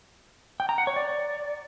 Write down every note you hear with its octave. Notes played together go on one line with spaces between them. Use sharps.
G5
A#5
F#5
C#5
D5